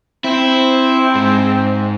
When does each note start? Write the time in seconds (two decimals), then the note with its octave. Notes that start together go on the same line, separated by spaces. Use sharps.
0.24 C4 E4
1.15 G#2